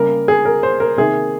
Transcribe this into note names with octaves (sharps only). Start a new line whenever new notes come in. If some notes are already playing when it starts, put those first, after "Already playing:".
Already playing: C#3 G3 A#3 A#4
G#4
A#4
C5
A#4
C3 D#3 A#3 G#4